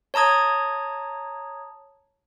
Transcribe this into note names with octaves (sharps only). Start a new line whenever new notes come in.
C#5 A5 A#5 D#6 G#6